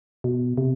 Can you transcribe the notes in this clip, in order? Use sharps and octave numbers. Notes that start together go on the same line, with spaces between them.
B2
C3